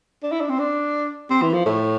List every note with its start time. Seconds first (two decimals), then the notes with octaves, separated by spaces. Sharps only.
0.23 D4
0.32 E4
0.41 D4
0.49 C4
0.59 D4
1.30 C4
1.42 E3
1.53 F3
1.66 A2